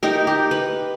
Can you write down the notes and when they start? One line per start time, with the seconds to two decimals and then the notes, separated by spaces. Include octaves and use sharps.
0.03 D#4 G4 A#4
0.27 G4
0.51 B4